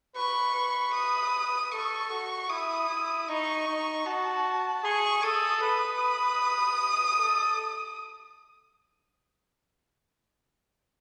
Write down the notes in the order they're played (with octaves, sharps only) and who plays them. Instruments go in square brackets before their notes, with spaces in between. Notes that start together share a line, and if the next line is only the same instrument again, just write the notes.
[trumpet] B4 [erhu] C#6
[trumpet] B4
[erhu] D#6
[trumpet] A4 [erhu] C#6
[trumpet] F#4
[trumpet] E4 [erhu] D#6
[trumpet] E4
[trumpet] D#4 [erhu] C#6
[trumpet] D#4
[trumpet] F#4 [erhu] A5
[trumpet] G#4 [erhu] C#6
[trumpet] A4 [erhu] D#6
[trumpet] B4 [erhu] D#6
[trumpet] A4